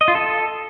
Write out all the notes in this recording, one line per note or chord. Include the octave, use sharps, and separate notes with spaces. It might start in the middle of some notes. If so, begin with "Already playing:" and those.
D#5
F4
A4